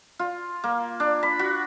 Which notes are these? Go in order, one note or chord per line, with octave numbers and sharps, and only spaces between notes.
F4
A#3
D4
B5
F#4